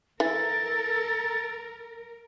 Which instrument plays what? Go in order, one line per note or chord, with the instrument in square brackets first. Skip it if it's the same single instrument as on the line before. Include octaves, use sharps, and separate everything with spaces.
[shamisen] E3 [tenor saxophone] A4 [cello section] A#4 [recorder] A6